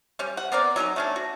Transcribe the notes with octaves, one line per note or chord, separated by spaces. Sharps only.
G3 C#4
F#5
B3 C4 A#4 D5
F#3 C#4 D#4 A#5
A3 C#4 D4
F#4